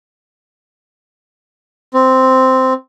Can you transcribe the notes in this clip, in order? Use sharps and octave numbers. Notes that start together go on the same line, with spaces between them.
C4